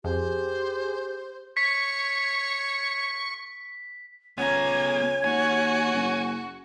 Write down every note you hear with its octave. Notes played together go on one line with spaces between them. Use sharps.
F2 G4 G#4 C5
C#5 C#6 B6
C#2 B3 C#5 G#5 A#5
D#2 F#4 G#5
F#1